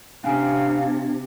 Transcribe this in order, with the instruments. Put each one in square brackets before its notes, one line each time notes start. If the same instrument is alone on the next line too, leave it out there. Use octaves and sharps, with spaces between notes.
[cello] C3 [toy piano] C#4 G#5 A#5 [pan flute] D4 [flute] F5